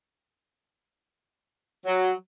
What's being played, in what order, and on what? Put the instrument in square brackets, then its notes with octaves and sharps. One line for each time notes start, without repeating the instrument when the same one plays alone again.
[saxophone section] F#3